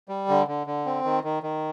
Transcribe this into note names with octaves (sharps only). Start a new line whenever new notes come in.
G3
D3
D3
D3
C4
D#3
D#3
D#3